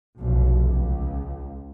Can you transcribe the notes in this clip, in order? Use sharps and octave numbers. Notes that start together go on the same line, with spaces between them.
F1 B1
C#2